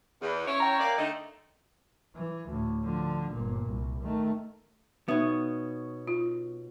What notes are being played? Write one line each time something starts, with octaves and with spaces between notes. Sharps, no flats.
E2
C#4 E4 C#5
G5 A#5
A#3 D5
D3 A3 D#4
E3
D2 A2
D3 F3
G1 A#2
C2
D#3 A3
B2 B3 D#4 C#5 E5 D#6
F4